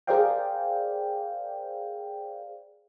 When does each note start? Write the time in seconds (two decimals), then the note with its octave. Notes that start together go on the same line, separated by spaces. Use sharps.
0.07 G#4 A#4 C5 D5 F5 G5